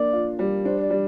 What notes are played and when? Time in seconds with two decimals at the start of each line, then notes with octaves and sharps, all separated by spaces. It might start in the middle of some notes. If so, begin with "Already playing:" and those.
Already playing: A#3 D4 D5
0.13 F4
0.39 G3
0.65 D4 C5
0.82 D5
0.90 G3